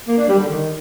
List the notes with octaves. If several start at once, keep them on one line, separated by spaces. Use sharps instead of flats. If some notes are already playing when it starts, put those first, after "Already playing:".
A#3
D4
G3
D3
D#3